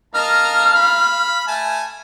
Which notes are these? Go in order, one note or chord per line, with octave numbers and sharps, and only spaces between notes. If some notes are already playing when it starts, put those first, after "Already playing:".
A#4 D#5 F5 A5 F6
B5
A3 G#5 A5